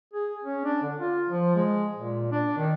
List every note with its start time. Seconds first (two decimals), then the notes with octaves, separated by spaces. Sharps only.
0.14 G#4
0.44 C#4
0.65 D4
0.82 D3
0.99 F4
1.29 F3
1.56 G#3
1.94 A#2
2.32 D4
2.57 D#3